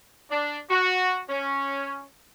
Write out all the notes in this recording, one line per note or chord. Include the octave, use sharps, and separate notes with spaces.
D4
F#4
C#4